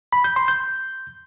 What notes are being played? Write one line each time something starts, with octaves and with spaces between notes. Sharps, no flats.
B5
G6
C6
G6